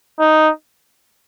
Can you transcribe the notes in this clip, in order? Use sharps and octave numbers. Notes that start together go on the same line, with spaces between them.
D#4